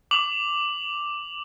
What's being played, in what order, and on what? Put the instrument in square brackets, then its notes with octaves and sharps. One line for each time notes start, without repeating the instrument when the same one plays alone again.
[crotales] D6 F7 F#7